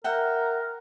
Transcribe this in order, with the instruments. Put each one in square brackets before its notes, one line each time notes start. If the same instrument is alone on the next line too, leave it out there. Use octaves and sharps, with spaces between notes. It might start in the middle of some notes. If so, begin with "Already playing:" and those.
[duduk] A#4 [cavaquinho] E5 F#5 G5